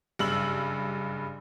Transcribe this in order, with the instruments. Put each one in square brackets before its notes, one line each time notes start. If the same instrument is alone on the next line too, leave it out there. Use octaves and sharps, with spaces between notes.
[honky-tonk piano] F#1 G2 E6 F#7